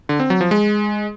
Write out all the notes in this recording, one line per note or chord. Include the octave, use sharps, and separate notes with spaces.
D3
C4
F#3
F3
G#3